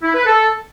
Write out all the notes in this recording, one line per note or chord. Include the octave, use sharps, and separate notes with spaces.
E4
B4
A4